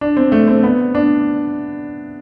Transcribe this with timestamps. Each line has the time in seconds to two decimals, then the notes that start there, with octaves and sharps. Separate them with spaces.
0.01 D4
0.17 C4
0.32 A3
0.47 C4
0.63 B3
0.95 D4